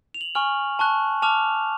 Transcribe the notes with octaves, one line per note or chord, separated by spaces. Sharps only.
F7
F#7
G#5 C#6 F6 F#7
A5 C#6 F#6
A5 D6 F6 F7